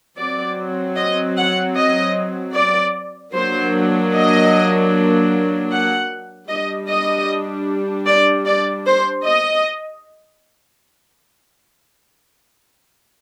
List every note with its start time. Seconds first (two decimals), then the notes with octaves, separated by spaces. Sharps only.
0.18 F#3 C4 D5
0.97 D#5
1.37 F#5
1.77 D#5
2.55 D5
3.34 F#3 A#3 D4 C5
4.13 D#5
5.71 F#5
6.49 G3 D4 D#5
6.89 D#5
8.07 D5
8.46 D5
8.86 C5
9.25 D#5